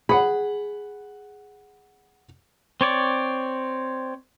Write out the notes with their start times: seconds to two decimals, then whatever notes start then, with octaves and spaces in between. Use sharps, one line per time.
0.09 G#4 F#5 B5
2.81 C4 C#5 D5